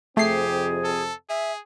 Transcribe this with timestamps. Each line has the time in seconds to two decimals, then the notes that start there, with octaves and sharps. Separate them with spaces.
0.17 F2 C3 A3 C4 G4 G#4 C7
0.84 A4
1.29 G#4 E5